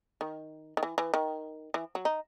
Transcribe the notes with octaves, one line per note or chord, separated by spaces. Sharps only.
D#3
D#3
E3
E3
D#3
E3
F#3
D#4